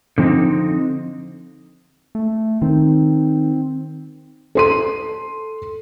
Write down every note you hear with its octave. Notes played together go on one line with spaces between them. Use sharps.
D3 F3 C4 D#4
A3
D#3 C4
A4 C6 D#7